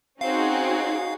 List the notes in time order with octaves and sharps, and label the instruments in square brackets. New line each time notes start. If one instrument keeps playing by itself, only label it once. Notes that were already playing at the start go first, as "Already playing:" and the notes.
[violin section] C4 C#4 [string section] D#4 F#4 G#4 [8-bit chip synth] F5